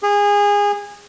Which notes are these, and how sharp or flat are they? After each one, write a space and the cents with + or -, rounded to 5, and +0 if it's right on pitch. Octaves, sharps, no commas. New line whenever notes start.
G#4 -25